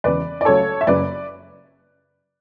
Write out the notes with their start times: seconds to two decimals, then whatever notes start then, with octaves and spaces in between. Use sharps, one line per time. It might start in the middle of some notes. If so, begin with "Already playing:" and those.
0.04 E1 E2 C#3 B4 D5
0.41 D5
0.45 C#2 C#3 F#3 A3 A4 C#5
0.81 E5
0.87 F#1 F#2 C#3 F#3 B4 D5